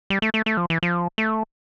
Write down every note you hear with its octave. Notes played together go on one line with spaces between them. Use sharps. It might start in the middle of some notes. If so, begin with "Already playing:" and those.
G3
A3
A3
A3
F3
E3
F3
A3